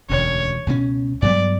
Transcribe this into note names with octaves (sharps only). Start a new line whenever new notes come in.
E1 D2 C#3 C#5
C#2 B2 G3 C#4
G2 F#3 B3 D5